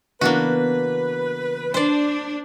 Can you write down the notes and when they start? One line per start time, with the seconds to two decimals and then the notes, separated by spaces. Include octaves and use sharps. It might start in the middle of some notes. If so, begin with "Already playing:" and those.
0.21 C#3 E3 A#3 B3 D4 F#4 B4
1.74 D4 C5 D5